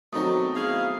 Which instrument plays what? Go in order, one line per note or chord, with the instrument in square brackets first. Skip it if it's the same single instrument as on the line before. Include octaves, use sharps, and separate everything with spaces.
[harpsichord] B2 D#3 F#3 [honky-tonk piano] A3 C4 D#4 [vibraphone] D#6
[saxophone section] E4 G#4 F5